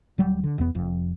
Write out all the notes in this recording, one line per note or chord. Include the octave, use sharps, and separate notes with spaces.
D1 F#3 G3
D3
E1 E2 B3
F1 F2